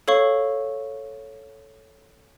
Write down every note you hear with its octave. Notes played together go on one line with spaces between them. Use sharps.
A4 C#5 F5 C#6